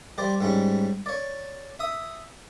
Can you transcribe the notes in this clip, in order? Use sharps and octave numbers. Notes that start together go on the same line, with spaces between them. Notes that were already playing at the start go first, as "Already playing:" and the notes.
G3 C5 D5
G#2 G3 C#4
C#5 D5
E5 D#6